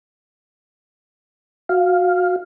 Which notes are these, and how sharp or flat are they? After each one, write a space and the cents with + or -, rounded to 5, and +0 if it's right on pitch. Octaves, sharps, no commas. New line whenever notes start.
F#4 -20 F5 +0